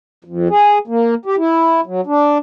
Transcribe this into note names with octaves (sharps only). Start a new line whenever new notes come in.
F2
G#4
A#3
G4
E4
F#3
D4